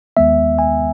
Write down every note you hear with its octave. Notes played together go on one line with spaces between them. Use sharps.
D#2 D#3 G#3 B3 E5
G#5